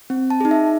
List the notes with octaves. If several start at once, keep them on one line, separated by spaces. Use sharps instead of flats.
C4
A5
D#4 G#4
E5